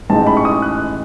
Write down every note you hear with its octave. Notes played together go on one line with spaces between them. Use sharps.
A1 G#2 E3 G#3 D#4 A5
B5
C#6
D#6
F#6